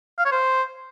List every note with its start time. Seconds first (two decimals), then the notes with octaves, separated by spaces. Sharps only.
0.19 F5
0.25 C#5
0.32 C5